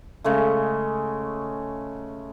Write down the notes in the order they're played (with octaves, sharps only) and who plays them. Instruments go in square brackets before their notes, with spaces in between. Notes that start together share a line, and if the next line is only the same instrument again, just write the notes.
[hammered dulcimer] C#3 G#3 A3